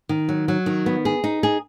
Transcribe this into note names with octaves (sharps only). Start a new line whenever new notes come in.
D#3
F#3
F#3
D#3
B3
G#4
D#4
G#4